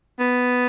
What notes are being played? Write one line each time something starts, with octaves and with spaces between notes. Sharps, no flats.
B3